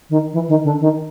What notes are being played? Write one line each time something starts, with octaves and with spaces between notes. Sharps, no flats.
D#3
E3
D#3
D3
D#3